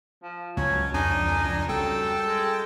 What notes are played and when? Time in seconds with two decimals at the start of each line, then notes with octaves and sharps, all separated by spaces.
0.23 F3
0.57 C#2 F#3 C#4
0.94 F2 D4 D#4 G#5
1.69 F#2 G3 A4 G5
2.27 G#3